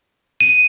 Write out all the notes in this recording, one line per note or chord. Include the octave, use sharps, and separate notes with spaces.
D#7